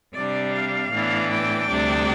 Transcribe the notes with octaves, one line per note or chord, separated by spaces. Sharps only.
C3 G3 D4 D5
F5
A2 E3 B3 D4
G5
D2 C3 G3 D4